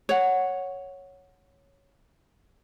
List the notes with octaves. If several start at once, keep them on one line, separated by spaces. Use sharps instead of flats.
C#5 F#5